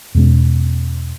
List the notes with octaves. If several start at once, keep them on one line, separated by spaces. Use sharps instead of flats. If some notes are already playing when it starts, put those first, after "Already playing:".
E2 B2 G#3 C#4